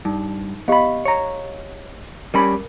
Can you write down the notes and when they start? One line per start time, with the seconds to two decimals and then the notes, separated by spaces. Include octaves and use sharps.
0.05 G2 D#4
0.68 B3 G4 D#5 F5 B5
1.05 C#5 A#5
2.34 G3 C#4 A#4 B5